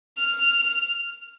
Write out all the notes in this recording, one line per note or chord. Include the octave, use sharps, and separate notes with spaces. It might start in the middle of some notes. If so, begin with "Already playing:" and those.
F6 F7